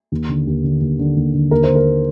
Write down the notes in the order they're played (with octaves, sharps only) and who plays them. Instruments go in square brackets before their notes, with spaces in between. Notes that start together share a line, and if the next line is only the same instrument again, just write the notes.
[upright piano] D#2
D3
D#2
D3
D#2
D3
D#2
D3
D#2 A#4
C5
D3
A#4